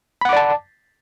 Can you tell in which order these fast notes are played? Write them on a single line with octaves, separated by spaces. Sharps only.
B5 F#5 D6 D5 A5